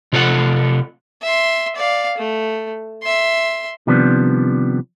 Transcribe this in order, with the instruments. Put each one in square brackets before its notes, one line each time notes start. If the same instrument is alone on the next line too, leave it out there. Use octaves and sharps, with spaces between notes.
[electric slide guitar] C3 F4 A4 C#5 F#5
[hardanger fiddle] E5 C6
D5 F5
A3
E5 C6
[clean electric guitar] C3 D#3 F3 G3 B3 D4